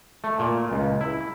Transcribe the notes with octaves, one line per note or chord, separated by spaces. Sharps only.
A3
A#2
C#2
E4